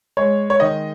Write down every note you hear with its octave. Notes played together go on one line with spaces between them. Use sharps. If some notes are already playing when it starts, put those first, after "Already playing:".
G#3 C#5
C#5
D#3 D#5